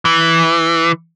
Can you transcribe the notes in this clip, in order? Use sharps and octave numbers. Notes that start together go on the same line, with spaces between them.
E3